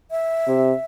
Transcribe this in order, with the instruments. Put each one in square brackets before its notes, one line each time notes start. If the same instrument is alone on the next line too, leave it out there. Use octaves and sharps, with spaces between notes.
[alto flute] E5
[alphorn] C3